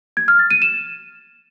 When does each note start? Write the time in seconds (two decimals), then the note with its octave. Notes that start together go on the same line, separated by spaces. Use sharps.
0.17 G#6
0.28 F6
0.39 A6
0.51 D#7
0.62 E7